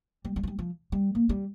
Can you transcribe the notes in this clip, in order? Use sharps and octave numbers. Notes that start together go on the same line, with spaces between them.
G3
G3
F3
G3
F3
G3
A#3
G3